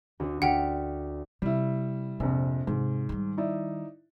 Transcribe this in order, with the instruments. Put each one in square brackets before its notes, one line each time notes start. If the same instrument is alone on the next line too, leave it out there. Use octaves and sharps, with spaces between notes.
[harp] D2 D4
[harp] D2 F6 B6 [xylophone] F#5 G5
[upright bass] C3 [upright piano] G3 E4
[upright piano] A#1 F2 [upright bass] C3
[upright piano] G#2 [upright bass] C3
[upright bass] D#3 G3
[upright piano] D#4 E4 D5